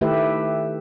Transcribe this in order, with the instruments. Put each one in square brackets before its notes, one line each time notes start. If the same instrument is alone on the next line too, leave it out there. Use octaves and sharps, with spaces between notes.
[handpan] D#3 A3 E4 G4 B4 E5